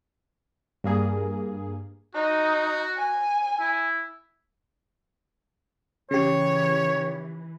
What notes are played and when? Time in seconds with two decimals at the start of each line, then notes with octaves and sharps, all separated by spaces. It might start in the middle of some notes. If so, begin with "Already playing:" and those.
0.84 G2 A#3 G#4
2.15 D#4 F#4
2.96 G#5
3.60 E4
6.11 C#3 E3 G4 C#5